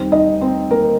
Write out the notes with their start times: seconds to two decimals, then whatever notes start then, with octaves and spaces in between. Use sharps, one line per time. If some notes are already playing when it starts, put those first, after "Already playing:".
Already playing: D#2 D#3 G3 C4 C5
0.12 D#4 D#5
0.41 C4 C5
0.71 A#3 A#4